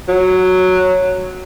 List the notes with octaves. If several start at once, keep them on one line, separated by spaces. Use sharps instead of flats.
F#3